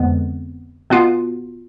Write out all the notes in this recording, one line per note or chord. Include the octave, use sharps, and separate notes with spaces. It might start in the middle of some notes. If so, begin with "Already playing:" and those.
Already playing: F2 D3 G#3 B3
B2 B3 F4